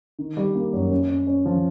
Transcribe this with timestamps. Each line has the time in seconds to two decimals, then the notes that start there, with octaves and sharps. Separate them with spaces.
0.19 D#3
0.37 G3
0.55 A#3
0.73 F#2
0.91 C#4
1.09 C#4
1.27 C#4
1.46 F3